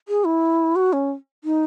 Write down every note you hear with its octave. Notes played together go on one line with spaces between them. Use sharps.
G#4
E4
F#4
C#4
D#4